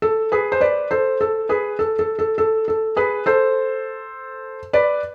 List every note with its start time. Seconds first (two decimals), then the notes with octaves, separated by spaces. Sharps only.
0.02 A4
0.32 G#4 B4
0.52 C5
0.61 B4 D5
0.91 A4 C5
1.21 A4
1.49 G#4 B4
1.79 A4
1.99 A4
2.19 A4
2.38 A4
2.68 A4
2.96 G#4 B4
3.26 A4 C5
4.73 B4 D5